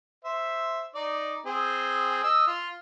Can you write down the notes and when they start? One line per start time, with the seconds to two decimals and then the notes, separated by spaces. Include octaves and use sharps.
0.25 C5 E5
0.95 D#4 D5
1.46 C4 G#4
2.24 D#5 E6
2.47 F4